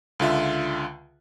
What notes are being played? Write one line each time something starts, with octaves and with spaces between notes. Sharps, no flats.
C#2 D3 F4 E5